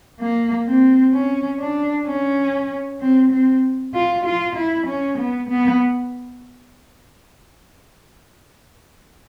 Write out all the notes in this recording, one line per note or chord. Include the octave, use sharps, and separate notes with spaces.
A#3
C4
C#4
D4
C#4
C4
C4
F4
F4
E4
C#4
B3
B3